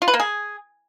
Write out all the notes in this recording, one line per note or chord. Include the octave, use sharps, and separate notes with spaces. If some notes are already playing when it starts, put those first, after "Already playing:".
F4
B4
A#3
G#4